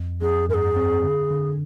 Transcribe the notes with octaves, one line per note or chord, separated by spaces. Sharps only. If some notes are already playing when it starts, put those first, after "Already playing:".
Already playing: F2
F2 G#4
G2 G#4 A#4
C4
D3
D3